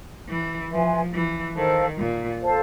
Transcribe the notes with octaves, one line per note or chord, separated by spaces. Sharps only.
E3
F3 B4 E5 G#5 C6
E3
D#3 A4 C5 F5 A5
A#2
A4 C5 F5 A5